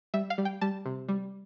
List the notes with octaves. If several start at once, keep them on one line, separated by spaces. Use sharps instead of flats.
G3 E5
F5
G3
G5
G3 A5
C3
G3